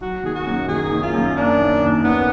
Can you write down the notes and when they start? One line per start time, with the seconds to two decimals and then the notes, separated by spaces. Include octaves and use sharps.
0.01 F#3 F#4
0.23 D#3 G#4
0.35 F#4
0.47 F#2
0.68 D#3 G#4
0.91 D#3
1.03 F4
1.13 F#2
1.36 A#3 D4
1.58 D#3
1.82 D#2
2.04 D#3 B3